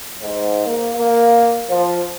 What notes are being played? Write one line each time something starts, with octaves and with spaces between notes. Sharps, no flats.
G#2
A#3
A#3
F3